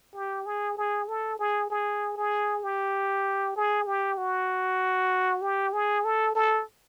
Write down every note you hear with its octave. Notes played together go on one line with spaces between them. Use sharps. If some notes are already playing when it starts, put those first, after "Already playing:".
G4
G#4
G#4
A4
G#4
G#4
G#4
G4
G#4
G4
F#4
G4
G#4
A4
A4